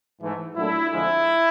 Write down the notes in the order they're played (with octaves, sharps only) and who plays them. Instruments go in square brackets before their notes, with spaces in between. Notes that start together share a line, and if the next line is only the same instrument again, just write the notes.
[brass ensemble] G#2 E3 A3
A#2 F#3 A3 D4 E4
F2 D3 F3 G#3 E4